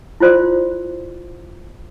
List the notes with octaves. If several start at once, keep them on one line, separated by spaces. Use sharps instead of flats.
E4 F4 C5 D5 C6